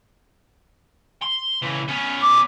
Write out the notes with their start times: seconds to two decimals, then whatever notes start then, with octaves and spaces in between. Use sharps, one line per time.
1.22 C6
1.62 C#3 E3
1.88 B3 C#4
2.22 D6